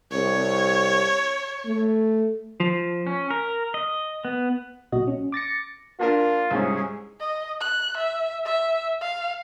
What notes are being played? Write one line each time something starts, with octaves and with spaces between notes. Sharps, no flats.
C2 C#5
A3
F3
C#4
A#4
D#5
B3
B1 A#2 F#4 D#5
C#4
D6 A6 A#6 C#7
A#3 D4 F4 A#4
C2 G#2 C#4 G#4
D#5
F#6
E5
E5
F5